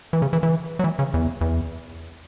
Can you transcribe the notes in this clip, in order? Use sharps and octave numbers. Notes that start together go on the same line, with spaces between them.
E3
C#3
E3
E3
F#3
E3
C#3
E2
E2